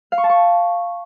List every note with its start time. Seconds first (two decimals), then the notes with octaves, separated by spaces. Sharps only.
0.12 F5
0.18 C#6
0.24 A5
0.29 C#6